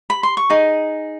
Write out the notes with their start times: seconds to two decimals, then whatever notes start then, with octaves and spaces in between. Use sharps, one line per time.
0.10 B5
0.23 C6
0.37 C#6
0.50 D#4 G#4